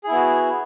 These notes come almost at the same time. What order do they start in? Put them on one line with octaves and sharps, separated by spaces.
G#4 E4 B3 F#4